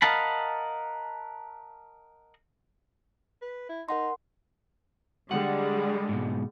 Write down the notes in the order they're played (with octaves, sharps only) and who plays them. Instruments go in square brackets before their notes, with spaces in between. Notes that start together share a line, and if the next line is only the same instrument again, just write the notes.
[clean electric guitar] A#4 D#5 F5 F#5 A5 B5
[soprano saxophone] B4
E4
[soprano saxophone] D#4 [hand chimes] A#4 F#5 C6
[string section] D3 G3 G#3 [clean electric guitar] F#5
[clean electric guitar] G#2 B2